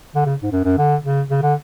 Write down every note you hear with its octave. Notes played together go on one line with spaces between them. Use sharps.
D3
C#3
G#2
F#2
F#2
D3
C#3
C#3
D3